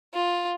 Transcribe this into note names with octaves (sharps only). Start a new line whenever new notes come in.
F4